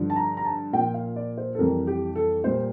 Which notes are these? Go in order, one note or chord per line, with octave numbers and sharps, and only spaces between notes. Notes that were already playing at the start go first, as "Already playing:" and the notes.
Already playing: G2 D3 F3
A5
A#5
A#5
A5
A#2 F3 G5
F5
D5
C5
A4
F2 E3 G3 A#4
G4
A4
A#2 G3 C5